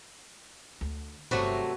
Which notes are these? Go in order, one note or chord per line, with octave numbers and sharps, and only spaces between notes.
D2
G1 C3 F#3 A3 F#4 B4